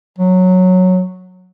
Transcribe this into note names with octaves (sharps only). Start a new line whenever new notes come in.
F#3